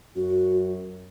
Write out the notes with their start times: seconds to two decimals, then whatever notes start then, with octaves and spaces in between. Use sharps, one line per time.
0.16 F#2 F#4